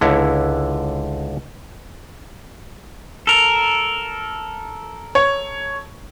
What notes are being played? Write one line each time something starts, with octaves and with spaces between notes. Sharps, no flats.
C#2 D3 E4 C#5 A#5
A4 A#4
C#5